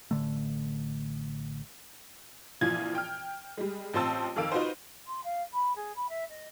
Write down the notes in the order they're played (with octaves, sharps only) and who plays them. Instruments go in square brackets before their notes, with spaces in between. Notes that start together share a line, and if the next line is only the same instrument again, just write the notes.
[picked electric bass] A1 D3 A3
[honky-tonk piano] A#1 E3 F3 F4 G#6
G5 F6
G3 G#3
A1 C4 F4 C5 A5 E6
F2 D#3 A4 F5 E6 D7
D#4 F4 F#4 B4 C5
[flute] C6
F5
B5
G#4
B5
E5
D#5